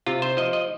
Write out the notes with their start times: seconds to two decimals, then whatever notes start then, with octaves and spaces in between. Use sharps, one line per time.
0.06 C3 F4
0.22 C5
0.37 F3 D#5
0.53 D#5